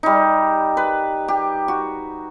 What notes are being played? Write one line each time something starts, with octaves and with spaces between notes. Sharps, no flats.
G3 D#4
B4
G4
F#4